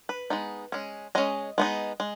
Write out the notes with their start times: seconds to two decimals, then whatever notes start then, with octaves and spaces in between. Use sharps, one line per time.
0.09 B4
0.30 G#3 B3 D#4
0.72 G#3 C#4
1.15 G#3 C#4 D#5
1.58 G#3 B3 D#4
2.00 G#3